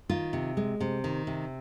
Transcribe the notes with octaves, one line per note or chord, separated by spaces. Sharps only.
D#3 F4
C3
G#3
C3
D#3
C3